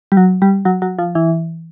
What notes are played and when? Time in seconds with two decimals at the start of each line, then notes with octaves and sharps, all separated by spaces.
0.12 G3
0.17 F#3
0.42 G3
0.65 F#3
0.82 F#3
0.99 F3
1.15 E3